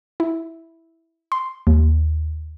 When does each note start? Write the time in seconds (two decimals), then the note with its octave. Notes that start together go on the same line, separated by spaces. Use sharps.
0.20 E4
1.32 C6
1.67 D#2